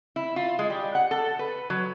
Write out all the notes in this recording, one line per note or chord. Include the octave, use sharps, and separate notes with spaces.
E4
F4
G#3
G3
F#5
A4
B4
F#3